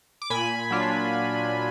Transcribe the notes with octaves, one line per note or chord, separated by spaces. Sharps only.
D6
A#2 G#5 B5
F#3 D4 F4